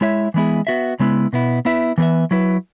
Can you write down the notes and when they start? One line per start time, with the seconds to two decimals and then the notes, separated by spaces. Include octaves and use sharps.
0.01 G#3 E4 C#5 E5
0.34 E3 G#3 B3 E4 G#4
0.67 B3 F#4 E5
1.00 C#3 G#3 B3 E4 B4
1.33 B2 B3 E4
1.65 B3 E4 B4 E5
1.98 E3 B3 G#4 B4 E5
2.31 F#3 E4 B4